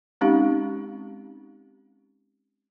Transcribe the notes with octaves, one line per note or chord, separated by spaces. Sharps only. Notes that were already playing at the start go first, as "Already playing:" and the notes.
G#3 C4 C#4 D#4 G4 F5